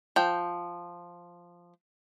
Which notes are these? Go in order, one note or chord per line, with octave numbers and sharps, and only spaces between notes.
F3 G5